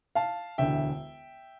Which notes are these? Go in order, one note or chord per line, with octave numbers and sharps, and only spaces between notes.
F5 A5
E1 D2 D3 E5 G5